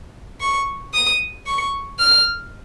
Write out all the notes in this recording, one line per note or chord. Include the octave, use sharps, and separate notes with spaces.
C#6
D#6
C#6
F6